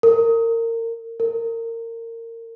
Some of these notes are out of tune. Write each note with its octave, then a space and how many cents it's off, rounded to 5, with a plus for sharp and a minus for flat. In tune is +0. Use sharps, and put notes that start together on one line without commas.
A#4 -25
A#4 -25